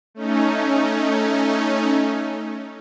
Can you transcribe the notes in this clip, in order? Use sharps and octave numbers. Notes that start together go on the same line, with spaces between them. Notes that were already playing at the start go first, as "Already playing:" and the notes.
A3 C#4 D#4